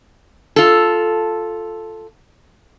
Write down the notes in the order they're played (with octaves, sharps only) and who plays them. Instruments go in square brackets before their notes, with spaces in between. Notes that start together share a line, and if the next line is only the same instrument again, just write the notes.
[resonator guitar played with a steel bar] F4 A4